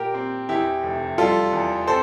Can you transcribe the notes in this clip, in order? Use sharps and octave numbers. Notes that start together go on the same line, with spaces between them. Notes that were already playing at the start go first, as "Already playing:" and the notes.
Already playing: A#2 G4 A#4
C4
E2 E4 G4
F1
G3 F4 A4
E2
C4 A4 C5